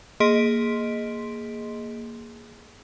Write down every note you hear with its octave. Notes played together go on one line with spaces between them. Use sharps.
A#3 G#4 D#5 C6 B6 D7